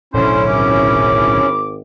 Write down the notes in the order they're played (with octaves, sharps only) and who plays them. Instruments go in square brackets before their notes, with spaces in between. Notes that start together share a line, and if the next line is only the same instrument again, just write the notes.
[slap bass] D1 B1 D4 [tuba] D3 [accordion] C#4 E4 [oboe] C5
[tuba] G#1 [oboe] D6